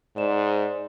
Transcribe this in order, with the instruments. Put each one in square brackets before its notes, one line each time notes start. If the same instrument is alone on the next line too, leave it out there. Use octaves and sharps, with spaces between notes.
[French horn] G#2 [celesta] D5 E7